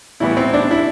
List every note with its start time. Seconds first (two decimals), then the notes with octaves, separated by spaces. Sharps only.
0.20 A2 E3 G3 B3 E4
0.37 C4
0.54 D4
0.71 E4